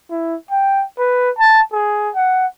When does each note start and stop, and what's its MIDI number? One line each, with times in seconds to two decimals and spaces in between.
0.10 0.35 64
0.51 0.84 79
0.99 1.30 71
1.38 1.61 81
1.73 2.10 68
2.15 2.46 78